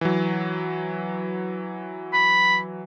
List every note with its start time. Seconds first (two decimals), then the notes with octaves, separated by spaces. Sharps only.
0.01 E3 F#3
2.13 B5